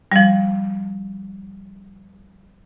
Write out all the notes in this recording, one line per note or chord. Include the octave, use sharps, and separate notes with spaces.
F3 G3